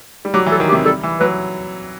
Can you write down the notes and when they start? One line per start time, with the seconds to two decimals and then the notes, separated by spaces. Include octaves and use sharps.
0.25 G3
0.34 F#3 G4
0.46 E3
0.51 A4
0.60 D#3
0.69 G4
0.73 C3
0.85 G3 A4
1.03 E3
1.20 F#3 B4